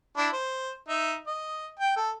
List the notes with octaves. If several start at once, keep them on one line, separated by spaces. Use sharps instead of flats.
D4 E4
C5
D#4 E5
D#5
G5
A4